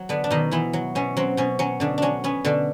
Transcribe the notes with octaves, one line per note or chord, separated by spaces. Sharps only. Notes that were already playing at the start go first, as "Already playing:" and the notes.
Already playing: F#3
D3 B3 D4
D4
B2 D#3 D#4
E3 B3 E4
F#3
B2 C#4
F#3 C4
B2 C#4
F#3 C#4
B2 D3 D4
F#3 C#4 D4
B3 C#4
B2 D3 D4